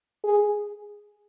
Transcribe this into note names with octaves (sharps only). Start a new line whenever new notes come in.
G#4